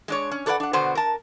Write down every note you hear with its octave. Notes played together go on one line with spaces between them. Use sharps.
G#3 D4 C#5
C#4
D4 A4 B4 C5 D5 F#5
D4 F#5
B2 D3 B3 F#4 C5
A#4 A5